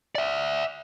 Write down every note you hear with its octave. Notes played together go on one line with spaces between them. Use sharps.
D5 E5